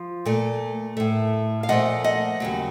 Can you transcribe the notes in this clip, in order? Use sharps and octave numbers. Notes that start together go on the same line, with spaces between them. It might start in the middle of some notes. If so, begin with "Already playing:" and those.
Already playing: F3
A#2 A3
A2 A3
F5
A#2 F3 A3 D#5 F#5
D#5 F#5
D#2 C#3 F#3